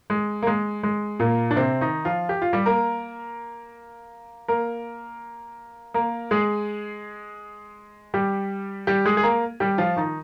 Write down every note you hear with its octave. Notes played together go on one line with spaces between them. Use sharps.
G#3
A#3
G#3
G#3
A#2 A#3
D4
C3 C4
D#3 D#4
F3 F4
G4
F4
G3 G4
A#3 A#4
A#3 A#4
A#3 A#4
G#3 G#4
G3 G4
G3 G4
G#3 G#4
G#4
A#3 A#4
G3 G4
F3 F4
D#3 D#4